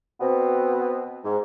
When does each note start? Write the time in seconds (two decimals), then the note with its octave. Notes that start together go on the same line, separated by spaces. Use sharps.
0.20 B2 B3 C4
1.24 G#2